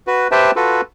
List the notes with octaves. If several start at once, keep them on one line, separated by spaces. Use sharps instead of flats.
F#4 B4
G4 B4 C5 E5 G5 A5
F4 F#4 A4 B4